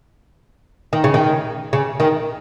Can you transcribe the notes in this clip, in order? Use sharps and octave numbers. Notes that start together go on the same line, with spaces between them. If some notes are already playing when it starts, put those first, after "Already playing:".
D#3
C#3
D#3
C#3
D#3